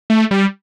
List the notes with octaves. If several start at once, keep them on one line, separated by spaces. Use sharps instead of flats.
A3
G3